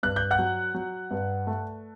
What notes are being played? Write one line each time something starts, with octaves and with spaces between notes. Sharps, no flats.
G2 F#6
G6
F#5 F#6
F#3
F#3
G2
A3